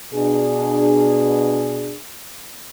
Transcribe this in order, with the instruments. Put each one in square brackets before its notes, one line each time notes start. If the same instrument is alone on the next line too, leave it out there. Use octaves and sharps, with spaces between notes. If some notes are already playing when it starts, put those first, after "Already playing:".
[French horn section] B2 D4 G#4